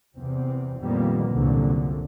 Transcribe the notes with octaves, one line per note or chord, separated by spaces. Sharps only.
E2 C3 C4
F2 A#2 D#3 G3 A#3 B3
C2 F#2 A#2 D3